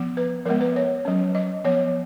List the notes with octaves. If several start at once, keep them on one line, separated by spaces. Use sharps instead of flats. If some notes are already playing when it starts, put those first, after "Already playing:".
Already playing: F3 B3
B4
F3 G#3 B3 A#4
B4
C#5
F#3 C#4
D#5
F3 B3 C#5